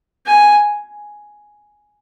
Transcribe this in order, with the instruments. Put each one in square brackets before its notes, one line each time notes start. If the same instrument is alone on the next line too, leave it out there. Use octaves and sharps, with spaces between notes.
[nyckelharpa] G#5